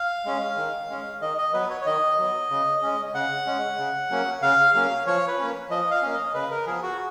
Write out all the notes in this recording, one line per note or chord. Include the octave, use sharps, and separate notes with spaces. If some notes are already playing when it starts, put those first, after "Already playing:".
Already playing: F5
G#3 C#4
D#3
G#3 C#4
D#3 D#5
D#5
F#3 B3 B4
C#5
C#5
D#3 D#5
F#3 B3
C#3
G#3 C#4
C#3 F#5
G#3 C#4
C#3
F#3 A#3 C#4
C#3 F5
F#3 A#3 C#4 F5
F3 C#5
B4
A#3 C#4
F3 D#5
F5
A#3 C#4
D#5
C#3 B4
A#4
F3 B3 G#4
F#4